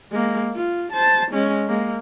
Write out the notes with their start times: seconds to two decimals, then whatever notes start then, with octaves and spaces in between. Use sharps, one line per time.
0.12 G#3 A#3
0.56 F4
0.93 C5 A5
1.32 G#3 C#4
1.68 G#3 A#3